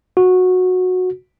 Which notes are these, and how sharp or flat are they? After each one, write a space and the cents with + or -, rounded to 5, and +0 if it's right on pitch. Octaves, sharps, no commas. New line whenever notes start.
F#4 -15